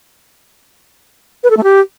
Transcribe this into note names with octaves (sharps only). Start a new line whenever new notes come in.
B4
A4
A3
G4